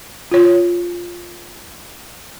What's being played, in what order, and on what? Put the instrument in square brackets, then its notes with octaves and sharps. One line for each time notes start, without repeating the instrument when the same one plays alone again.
[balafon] F4 C#5